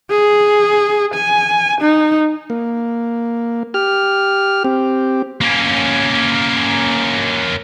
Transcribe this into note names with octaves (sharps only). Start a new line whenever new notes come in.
G#4
G#5
D#4
A#3
G4 F6
C4 G4
A#3 C#4